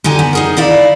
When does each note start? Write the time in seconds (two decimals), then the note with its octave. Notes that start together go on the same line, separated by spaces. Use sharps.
0.04 D3 D#4 G4 G#5
0.19 B3
0.33 D#4 G#4 A#4
0.57 D#4 E4 D5 F5